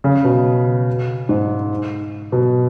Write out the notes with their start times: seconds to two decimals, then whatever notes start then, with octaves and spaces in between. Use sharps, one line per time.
0.04 C#3
0.24 B2
1.29 G#2
2.32 B2